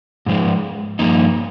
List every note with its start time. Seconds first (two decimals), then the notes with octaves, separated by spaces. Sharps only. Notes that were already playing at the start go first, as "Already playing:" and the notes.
0.26 G#2 F3 G#3
0.99 G2 F3 A#3 D#4